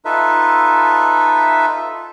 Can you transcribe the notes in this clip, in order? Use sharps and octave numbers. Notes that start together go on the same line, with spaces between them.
D#4 F4 A4 B4 E5